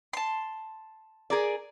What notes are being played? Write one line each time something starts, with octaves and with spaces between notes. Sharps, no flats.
A5 C6
G#4 A#4 D5